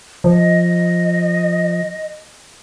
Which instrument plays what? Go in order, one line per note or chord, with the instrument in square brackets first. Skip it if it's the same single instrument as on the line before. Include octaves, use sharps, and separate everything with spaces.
[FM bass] F3 [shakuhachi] D#5